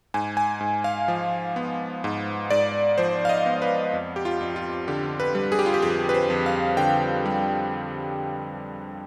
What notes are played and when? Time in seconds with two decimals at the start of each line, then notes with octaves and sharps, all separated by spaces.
0.14 G#2 G#5
0.37 G#5
0.61 G#2
0.84 F5
1.08 F3
1.56 B3
2.04 G#2
2.51 G#2 D5
2.98 F3 C5
3.25 F5
3.29 D#5
3.46 B3
3.62 B4
3.93 F2
4.16 G4
4.25 F4
4.41 F2
4.56 F4
4.88 D3 G4
5.20 B4
5.35 G3
5.52 G#4
5.59 G4
5.66 F4
5.74 G4
5.82 F2 G#4
6.09 B4
6.14 C5
6.30 F2
6.46 F5
6.77 D3 G5
7.26 G3